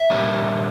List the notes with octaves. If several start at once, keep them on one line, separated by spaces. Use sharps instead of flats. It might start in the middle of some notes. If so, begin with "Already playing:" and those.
Already playing: E5
A#2 G3 A#3 D4